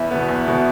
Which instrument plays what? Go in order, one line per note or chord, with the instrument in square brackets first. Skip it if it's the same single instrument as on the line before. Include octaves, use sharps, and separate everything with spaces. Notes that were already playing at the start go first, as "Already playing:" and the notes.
Already playing: [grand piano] E2 [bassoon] E4
[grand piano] B2 B3
E2
B2 B3